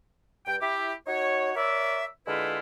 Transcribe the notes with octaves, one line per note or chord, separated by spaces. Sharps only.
G2 G5
E4 G4
D#4 F#4 C#5
A#4 C#5 D5 E5
D3 G#3 E4 F4 B4